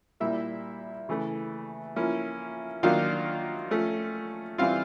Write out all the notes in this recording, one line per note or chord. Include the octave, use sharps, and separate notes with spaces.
A#2 G3 A#3 E4 E5
C#3 E3 A3
F3 A#3 C#4 E4
D#3 F#3 A#3 D4 F4 F5
F3 A3 C#4
E3 G3 C4 E4 F4 F5